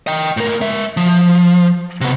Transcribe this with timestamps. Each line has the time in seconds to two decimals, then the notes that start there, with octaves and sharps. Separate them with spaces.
0.07 D#5 G5
0.37 A2 A#4
0.61 G#3 E5
0.97 F3
2.01 C3 B3